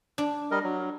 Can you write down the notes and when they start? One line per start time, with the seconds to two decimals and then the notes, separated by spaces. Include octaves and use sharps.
0.18 D4
0.51 G3 A#4 D#5
0.64 F#3